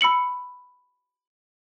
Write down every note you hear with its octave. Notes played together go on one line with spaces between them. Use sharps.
B5 E6 C#7 F#7